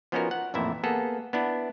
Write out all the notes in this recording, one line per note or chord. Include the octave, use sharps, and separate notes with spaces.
F3 B3 C#4 D#4 F#4 A#4
F#5
A1 F2 A#2 E4 E5
A#3 B3 G#4 A4
B3 D4 E4